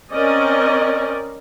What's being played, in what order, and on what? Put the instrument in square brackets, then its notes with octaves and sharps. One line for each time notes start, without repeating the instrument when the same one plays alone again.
[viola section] C4 C#4 A#4 D5 D#5